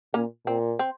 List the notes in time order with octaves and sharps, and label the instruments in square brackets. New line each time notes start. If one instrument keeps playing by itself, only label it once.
[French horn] A#2 [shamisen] A#3 C#4
[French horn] A#2 [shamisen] C4
[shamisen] C4